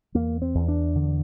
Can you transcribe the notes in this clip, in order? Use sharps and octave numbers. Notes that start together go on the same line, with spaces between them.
E2 A#3
C4
E2
D4
D3